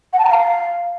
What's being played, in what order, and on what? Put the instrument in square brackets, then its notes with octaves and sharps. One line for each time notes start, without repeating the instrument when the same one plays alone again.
[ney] F#5
A5
A#5
F5